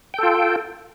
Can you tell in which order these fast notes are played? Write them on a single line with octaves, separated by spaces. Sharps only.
G5 A4 F4